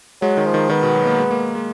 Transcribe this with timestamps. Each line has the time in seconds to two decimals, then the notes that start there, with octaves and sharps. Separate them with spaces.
0.21 F#3 G#3
0.37 D#3
0.45 F3
0.54 D#3
0.69 D#3 B3
0.83 B2
0.95 F#3
1.06 A#3
1.18 G#3
1.31 A#3
1.55 G#3